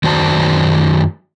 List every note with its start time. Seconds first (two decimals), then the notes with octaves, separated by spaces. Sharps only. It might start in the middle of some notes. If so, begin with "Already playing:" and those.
0.03 F#2 D#3 F#4 C5 D5 A5